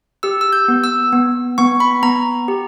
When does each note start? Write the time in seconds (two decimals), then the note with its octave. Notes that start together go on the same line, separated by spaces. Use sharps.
0.23 G4 E6
0.41 E6
0.53 G6
0.68 B3
0.84 E6
1.13 B3
1.58 B3 C#6
1.80 B5
2.03 B3 A#5
2.48 G4